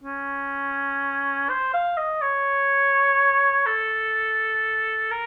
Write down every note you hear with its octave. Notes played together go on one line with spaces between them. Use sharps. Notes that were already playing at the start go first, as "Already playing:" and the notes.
C#4
C5
F5
D#5
C#5
A4
A#4